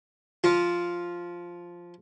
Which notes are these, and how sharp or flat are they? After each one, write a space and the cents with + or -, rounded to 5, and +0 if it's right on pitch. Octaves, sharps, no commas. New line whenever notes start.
F3 +0 F4 +0